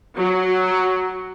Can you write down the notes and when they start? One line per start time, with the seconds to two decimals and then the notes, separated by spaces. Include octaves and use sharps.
0.17 F#3